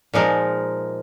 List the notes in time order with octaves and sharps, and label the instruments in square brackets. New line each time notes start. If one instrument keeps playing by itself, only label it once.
[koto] A#2 F3 G#3 D#4 A#4